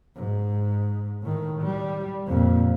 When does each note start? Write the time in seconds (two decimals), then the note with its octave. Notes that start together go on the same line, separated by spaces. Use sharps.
0.15 G#2
1.22 A2 D#3
1.62 G3
2.26 F2 A#2